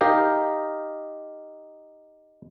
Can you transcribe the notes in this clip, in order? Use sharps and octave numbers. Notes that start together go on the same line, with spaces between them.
D#4 G4 A#4 D#5 F5